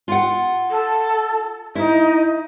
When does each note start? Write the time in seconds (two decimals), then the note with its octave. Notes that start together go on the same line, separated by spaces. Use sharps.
0.08 F4 F#5
0.70 A4
1.75 D#4 E4